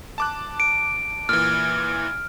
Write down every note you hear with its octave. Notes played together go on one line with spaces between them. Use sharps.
A5 D6 F#6
D7
A#2 E3 F6